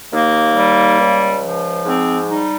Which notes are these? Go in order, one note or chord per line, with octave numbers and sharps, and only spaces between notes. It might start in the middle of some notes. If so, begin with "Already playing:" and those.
D#2 A#3
G3
C#2
F3
G#2 C4
G3 D#4